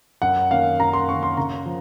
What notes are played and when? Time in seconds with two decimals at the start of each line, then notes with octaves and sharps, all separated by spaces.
0.22 F#2 F#5
0.51 D#3 A#3 C#4 F5
0.80 F#2 A#5
0.93 C6
1.09 D#3 A#3 C#4 C#6
1.23 C6
1.37 C#3 A#5
1.66 F3